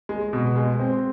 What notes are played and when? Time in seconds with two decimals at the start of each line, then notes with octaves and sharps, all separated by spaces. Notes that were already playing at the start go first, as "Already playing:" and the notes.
0.09 G#3
0.33 B2
0.56 G#3
0.79 C4